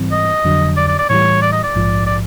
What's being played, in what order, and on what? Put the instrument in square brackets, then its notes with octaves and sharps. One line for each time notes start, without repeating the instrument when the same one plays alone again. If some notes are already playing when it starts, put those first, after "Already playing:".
Already playing: [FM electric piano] G#2 E3 G3 C4
[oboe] D#5
[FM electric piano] F2 D3 F#3
[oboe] D5
D5
D5
[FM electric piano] A2 E3 G3 [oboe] C#5
[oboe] D5
D#5
D5
[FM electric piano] A#1 G#2 F3
[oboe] D5